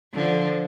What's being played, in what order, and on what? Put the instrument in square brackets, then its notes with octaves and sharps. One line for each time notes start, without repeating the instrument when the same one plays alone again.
[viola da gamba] D3 F3